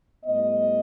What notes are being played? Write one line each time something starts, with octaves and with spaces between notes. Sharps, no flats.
A2 G3 B3 D#5